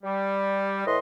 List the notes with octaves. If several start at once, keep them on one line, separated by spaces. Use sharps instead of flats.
G3
A2 E3 B4 D#5 C6